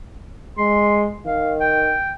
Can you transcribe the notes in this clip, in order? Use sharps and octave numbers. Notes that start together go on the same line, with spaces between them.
G#3 C6
D#3 F5
G5